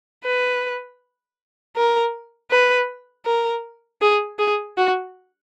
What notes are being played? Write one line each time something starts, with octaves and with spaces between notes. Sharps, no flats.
B4
A#4
B4
A#4
G#4
G#4
F#4